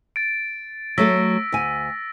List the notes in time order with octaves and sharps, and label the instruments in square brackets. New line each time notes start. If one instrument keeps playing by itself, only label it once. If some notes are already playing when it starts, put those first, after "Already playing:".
[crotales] A6 D7
[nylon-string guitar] F#3 A3 A4 [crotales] E6 A#6 B6
[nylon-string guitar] D2 G#5